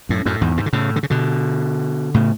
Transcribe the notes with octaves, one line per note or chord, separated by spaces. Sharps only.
F#2 A2
F#2 A2
E2 G#2
G#2 B2
D3
A2 C#3
D3
C#3
B2 D3
A2 C#3